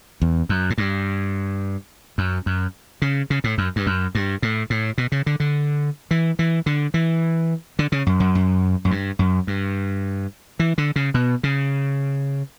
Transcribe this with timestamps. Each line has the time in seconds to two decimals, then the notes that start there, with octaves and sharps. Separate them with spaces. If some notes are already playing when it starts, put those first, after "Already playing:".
0.22 E2
0.49 F#2
0.70 A2
0.78 G2
2.18 F#2
2.46 F#2
3.02 C#3
3.30 C#3
3.44 A2
3.58 F#2
3.76 G2
3.86 F#2
4.15 G2
4.42 A2
4.70 A2
4.98 B2
5.12 C#3
5.26 D3
5.40 D3
6.11 E3
6.39 E3
6.66 D3
6.94 E3
7.79 D3
7.92 C#3
8.06 F#2
8.20 F#2
8.35 F#2
8.85 F#2
8.91 G2
9.19 F#2
9.47 G2
10.59 E3
10.78 D3
10.96 C#3
11.14 B2
11.43 C#3